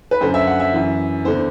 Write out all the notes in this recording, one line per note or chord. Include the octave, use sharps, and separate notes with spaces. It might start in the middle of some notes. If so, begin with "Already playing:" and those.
B4
F#2 D3 C5
E5
F#5
E5
F#2 E3
E2 D3 C5